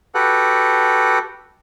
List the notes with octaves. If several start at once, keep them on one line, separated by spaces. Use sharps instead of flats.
F#4 G4 A4 B4 F#5